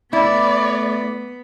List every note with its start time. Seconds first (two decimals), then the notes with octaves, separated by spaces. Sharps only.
0.13 A3 B3 E4 D5